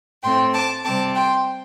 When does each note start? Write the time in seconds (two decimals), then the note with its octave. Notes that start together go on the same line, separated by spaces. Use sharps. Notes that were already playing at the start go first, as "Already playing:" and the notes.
0.22 A2 A3 C4 G5 C6
0.53 A5 D6
0.84 C3 G3 C4 A5 D6
1.15 G5 C6